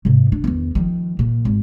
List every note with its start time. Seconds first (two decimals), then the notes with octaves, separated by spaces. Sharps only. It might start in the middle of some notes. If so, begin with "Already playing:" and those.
0.05 G#2 C3
0.32 D4
0.44 E2 D#3
0.75 D#3 F3
1.19 A#2
1.45 G#1